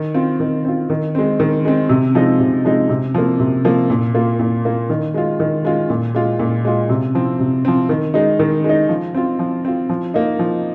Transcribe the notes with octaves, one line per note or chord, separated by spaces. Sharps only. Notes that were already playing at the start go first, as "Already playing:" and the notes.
Already playing: D#3
C4 F4
D#3
C4 F4
D#3
G#3 C4
D#3
G#3 C4
C3
F3 G#3 D#4
C3
F3 G#3 D#4
C3
F3 A#3
C3
F3 A#3
A#2
A#3 F4
A#2
A#3 F4
D#3
G#3 F4
D#3
G#3 F4
A#2
G#3 F4
A#2
G#3 F4
C3
F3 C4
C3
F3 C4
D#3
G#3 D#4
D#3
G#3 D#4
F3
C4 F4
F3
C4 F4
F3
A#3 D#4
F3